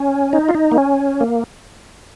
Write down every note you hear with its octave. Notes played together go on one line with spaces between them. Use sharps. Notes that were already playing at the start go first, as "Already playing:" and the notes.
Already playing: C#4
D#4
F4
D#4
A#3
C#4
A#3